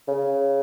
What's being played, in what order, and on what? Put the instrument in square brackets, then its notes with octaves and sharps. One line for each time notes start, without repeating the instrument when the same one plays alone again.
[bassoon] C#3